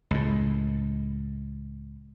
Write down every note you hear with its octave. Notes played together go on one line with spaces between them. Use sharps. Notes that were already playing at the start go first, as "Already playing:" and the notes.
C#2 A2